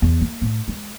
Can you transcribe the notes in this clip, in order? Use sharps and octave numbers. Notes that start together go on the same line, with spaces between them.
E2
A#3
A2
G#3